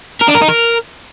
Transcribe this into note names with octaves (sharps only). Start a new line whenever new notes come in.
A#4
D4
A#4
D#4
A#4